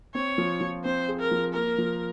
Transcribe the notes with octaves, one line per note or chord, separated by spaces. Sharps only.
C4 C#5
F3
F3
C4 C5
G#4
A#4
F3
A#3 A#4
F3